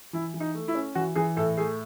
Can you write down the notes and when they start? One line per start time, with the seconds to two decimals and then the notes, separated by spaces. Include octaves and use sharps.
0.13 E3 E4
0.34 E3
0.40 D#4
0.54 A3
0.68 E4
0.75 C#4
0.95 E3 F#4
1.15 E3 G#4
1.36 A2 A4
1.58 A3 G#4